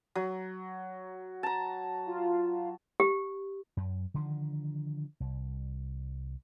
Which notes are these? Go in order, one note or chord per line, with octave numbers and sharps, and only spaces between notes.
F#3
A5 A#5
F4
G4
F#2
D3 D#3 F3
C2